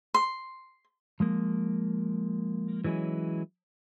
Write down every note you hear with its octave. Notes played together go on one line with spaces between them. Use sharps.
C6
F3 G#3 A#3
E3 F#3 G#3 C#4 E4